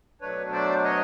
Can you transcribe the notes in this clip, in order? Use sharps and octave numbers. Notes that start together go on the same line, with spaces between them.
B2 F#3 A3 D4 B4 C#5
C5 D5
C#5 D#5